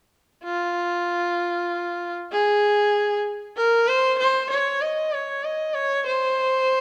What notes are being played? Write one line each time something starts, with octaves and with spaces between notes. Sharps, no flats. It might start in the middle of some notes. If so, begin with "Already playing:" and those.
F4
G#4
A#4
C5
C5
C#5
D#5
C#5
D#5
C#5
C5